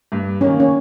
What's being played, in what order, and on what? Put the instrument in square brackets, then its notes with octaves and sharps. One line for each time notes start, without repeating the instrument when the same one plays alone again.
[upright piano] G2
[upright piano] D#3 A#3 [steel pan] C#4
[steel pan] C#4